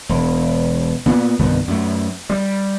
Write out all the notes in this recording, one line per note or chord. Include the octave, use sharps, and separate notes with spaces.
E1
A#2 B3
C2 G2 D#3 B3
F#2 A3
G3